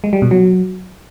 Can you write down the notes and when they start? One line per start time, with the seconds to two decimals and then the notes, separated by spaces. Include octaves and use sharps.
0.04 G#3
0.13 G3
0.22 B2
0.31 F#3